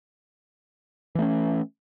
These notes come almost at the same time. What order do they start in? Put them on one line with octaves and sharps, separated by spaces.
E3 A3 C#4